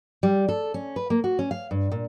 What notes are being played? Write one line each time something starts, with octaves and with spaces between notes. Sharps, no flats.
G3
A4
C#4
B4
A#3
F#4
C#4
F5
G2
A#2